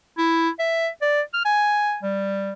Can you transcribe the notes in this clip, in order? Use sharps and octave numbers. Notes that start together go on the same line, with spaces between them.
E4
E5
D5
F6
G#5
G3